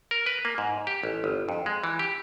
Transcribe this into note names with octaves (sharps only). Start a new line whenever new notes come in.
A#4
B4
A#3
G#2
G4
A1
G1
F2
G#3
E3
G4